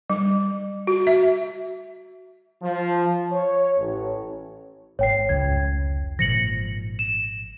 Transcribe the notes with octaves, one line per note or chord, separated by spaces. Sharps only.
G3
F#4
E5
F3
C#5
A1
G#1 C#5 G5 C7
F1 C#2 G#6
G#1 A#2 F3 A#6 C#7 F#7
E7